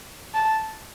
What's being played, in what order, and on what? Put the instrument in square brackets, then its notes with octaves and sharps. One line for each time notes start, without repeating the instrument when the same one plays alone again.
[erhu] A5